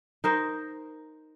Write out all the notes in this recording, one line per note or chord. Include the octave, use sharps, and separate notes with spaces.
D#4 A#4 C5